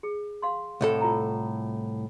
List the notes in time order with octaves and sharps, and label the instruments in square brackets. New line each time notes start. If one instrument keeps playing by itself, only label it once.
[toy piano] G#4
F5 C6
[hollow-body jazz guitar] C2 A2 A4
[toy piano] F4 A#5